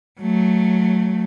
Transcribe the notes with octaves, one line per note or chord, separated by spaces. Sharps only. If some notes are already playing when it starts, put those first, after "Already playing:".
F#3 A3